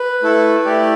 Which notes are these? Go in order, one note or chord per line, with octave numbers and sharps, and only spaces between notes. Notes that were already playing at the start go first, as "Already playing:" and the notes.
Already playing: B4
A3 E4 A4
A3 E4 G4 D5